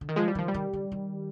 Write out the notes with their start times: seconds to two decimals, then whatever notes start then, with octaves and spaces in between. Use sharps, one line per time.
0.01 D3
0.09 D#3
0.16 F3 G#3
0.28 G3
0.35 D#3 F3
0.48 G3
0.54 D#3
0.73 D3
0.92 D#3